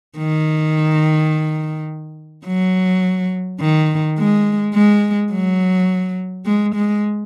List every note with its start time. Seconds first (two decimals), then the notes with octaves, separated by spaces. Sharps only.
0.18 D#3
2.46 F#3
3.61 D#3
4.18 G#3
4.74 G#3
5.32 F#3
6.46 G#3
6.75 G#3